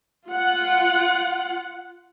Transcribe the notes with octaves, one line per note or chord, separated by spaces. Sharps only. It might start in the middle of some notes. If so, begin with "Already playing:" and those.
F4 F#5